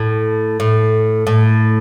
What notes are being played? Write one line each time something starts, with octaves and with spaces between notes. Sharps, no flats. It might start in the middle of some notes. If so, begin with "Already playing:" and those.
Already playing: A2
A2
A2